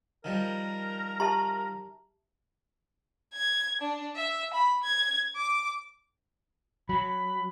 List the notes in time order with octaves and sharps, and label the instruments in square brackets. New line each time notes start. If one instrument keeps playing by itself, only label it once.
[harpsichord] D#3 F3 G3 [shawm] A#4
[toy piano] G4 E5 A5 [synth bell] A#5
[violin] G#6
D4
E5
B5
G#6
D6
[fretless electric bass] F#3 [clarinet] B5